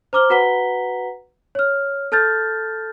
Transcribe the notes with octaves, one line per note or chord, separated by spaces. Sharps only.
C5 A#5 D6 F6 G7
F#4 B4 F#5 A#5 B6 G7
C#5 F6
A4 A5 F6 G6 A6